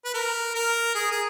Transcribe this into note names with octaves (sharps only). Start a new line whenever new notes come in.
B4
A#4
A#4
G#4
G#4